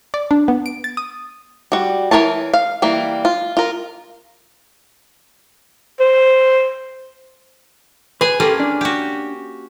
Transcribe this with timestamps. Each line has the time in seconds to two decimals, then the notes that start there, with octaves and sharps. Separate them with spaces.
0.14 D5
0.31 D4
0.48 B3
0.66 D7
0.84 A6
0.97 D#6
1.72 G3 F#4
2.11 E3 F#4 A#4 C#5 A5
2.54 F5
2.82 E3 G3 A#3
3.25 F4
3.57 F4 A#4
6.00 C5
8.21 G#4 B4 G#5
8.40 A#3 C#4 F4 G4 A4
8.60 D4
8.81 F#4 G4